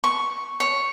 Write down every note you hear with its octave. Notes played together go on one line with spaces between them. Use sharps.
C#6
C#5